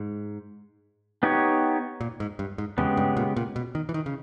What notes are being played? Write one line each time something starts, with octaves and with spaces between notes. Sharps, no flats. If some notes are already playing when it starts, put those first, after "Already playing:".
Already playing: G#2
B3 D#4 G4 C#5
A#2
G#2
G2
G#2
E2 C#3 G#3 B3 G4
G2
A#2
A#2
B2
D#3
E3
D#3
C#3